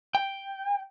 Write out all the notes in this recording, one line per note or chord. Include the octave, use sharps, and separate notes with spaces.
G5